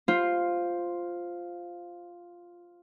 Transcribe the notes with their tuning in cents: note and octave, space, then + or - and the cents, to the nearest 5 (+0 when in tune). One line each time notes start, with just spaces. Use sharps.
F4 +0 C5 +0